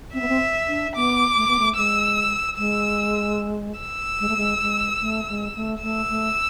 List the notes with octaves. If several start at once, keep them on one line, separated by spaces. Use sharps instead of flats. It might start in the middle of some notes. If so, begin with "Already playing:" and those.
C4 E5
B3
C4
D4
B3 D6
A3
B3
A3
G#3 E6
G#3 E6
E6
G#3
A3
G#3
G#3
A3
G#3
A3
A3 E6
A3